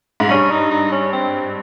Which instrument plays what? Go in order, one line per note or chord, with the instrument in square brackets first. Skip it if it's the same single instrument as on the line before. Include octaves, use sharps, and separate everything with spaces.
[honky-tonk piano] G#2
[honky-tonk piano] G2 [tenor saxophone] C#4
[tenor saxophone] D#4
D#4
C#4
C4